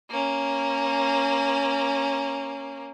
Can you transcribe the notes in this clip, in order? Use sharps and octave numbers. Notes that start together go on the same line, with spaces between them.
A#3 C#4